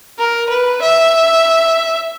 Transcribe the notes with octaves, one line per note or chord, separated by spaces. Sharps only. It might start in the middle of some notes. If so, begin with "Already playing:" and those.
A#4
B4
E5